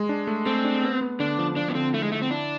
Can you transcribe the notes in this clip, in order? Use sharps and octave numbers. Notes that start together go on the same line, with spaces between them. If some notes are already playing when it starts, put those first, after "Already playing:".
Already playing: G#3
D4
A3
A3 C4
D4
B3
B3
D3 D4
F3
F3 D4
B3
D3 C4
A3 E4
G#3
D3 A3
C4
D4 E4